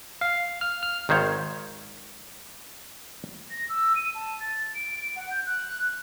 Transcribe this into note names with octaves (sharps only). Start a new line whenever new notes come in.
F5
F6
F6
G#1 D#3 C5 C#5 F5
A#6
E6
D#7
A5
A6
D7
F#5
G6
F#6